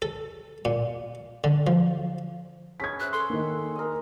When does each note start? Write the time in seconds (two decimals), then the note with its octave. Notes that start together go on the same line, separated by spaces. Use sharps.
0.02 A4
0.65 A#2
1.44 D3
1.67 F3
2.80 C#4 G#4 B4 G#6 B6
3.00 C5 E5 F#6
3.13 A4 C6
3.30 D#3 A#3
3.75 A#4 D#5